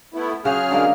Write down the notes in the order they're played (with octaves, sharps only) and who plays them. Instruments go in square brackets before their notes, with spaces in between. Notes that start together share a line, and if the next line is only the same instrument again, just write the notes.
[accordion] A3 B3 E4
[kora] C#3 F#4 C5 [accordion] F#3 G#4 F6
[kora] D3 G#3 A#3